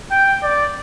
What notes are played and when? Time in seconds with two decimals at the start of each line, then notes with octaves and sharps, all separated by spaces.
0.11 G5
0.43 D5